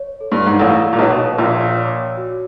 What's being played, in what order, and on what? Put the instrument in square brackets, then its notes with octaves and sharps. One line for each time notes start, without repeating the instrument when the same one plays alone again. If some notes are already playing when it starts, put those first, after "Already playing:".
Already playing: [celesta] C#5
A4
[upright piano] G2
G#2
[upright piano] A1 A2 [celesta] F5
[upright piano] A#2
[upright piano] B1 B2 [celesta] C#5
[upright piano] A#1 A#2 [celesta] F5
[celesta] C#5
F#4